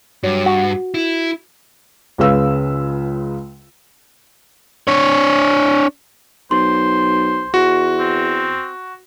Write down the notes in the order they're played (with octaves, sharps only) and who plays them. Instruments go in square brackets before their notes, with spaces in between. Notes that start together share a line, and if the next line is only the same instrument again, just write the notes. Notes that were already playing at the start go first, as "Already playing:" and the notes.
[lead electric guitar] G2 [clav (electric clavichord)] F#3
[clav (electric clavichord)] F#4
[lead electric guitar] E4
[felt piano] C#2 C#3 G#3 B4 F5 E6
[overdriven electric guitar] D4 C#5
[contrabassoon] B1 [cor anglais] C5 [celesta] C6
[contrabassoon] E2 [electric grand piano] F#4
[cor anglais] C4